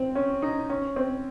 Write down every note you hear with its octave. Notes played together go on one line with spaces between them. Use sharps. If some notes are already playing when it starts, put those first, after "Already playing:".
Already playing: C4
C#4
D#4
C#4
C4